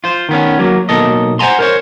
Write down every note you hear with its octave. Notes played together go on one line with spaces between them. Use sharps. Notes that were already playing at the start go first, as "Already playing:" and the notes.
F4 C5
D#3 B3 C#4
F#3 A#3
B1 G2 B2 A#3 A4 D#5
C5 D#5 F#5 G#5 A#5 C6
A#4 C5 C#5